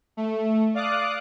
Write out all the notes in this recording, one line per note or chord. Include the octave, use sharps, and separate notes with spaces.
A3
D5 F5 D6 D#6 F#6